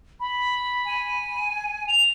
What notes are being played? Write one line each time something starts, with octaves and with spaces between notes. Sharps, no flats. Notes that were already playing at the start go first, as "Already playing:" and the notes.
B5
G#5
F7